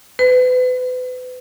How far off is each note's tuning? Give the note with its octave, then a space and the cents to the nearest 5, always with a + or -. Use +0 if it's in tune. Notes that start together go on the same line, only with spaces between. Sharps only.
B4 +35